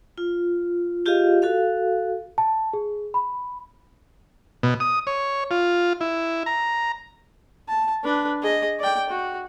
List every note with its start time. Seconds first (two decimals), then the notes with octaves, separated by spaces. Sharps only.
0.18 F4
1.06 F4 G4 G#4 D#5 F5
1.42 F#4 A4 F5
2.38 A5
2.73 G#4
3.14 B5
4.63 B2
4.80 D#6
5.07 C#5
5.51 F4
6.01 E4
6.46 A#5
7.68 A5
8.04 D4 B4
8.42 G#4 D#5
8.80 D5 G5
9.10 F#4